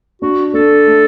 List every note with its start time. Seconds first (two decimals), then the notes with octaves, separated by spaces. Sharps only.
0.22 D4 F#4
0.54 D4 A4
0.86 A3